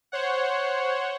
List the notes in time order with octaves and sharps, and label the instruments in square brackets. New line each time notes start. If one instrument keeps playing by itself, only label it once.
[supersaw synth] C5 C#5 F#5